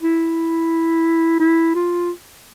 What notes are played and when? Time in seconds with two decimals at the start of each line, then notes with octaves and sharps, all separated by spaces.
0.02 E4
1.40 E4
1.75 F4